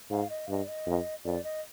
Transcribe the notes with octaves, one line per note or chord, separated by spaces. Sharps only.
G#2 F5
D#5
G2 D#5 F5
D5
D#5
F2
F2 D5
D#5